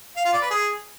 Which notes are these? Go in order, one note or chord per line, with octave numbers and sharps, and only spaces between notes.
F5
F4
D5
B4
G#4